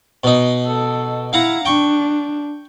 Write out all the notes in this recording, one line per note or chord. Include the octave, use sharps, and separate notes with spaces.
B2 D#4
A4
E4 F5 F#5 A#5
D4 G5 C#6